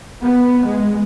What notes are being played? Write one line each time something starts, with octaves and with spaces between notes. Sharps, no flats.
B3
G#3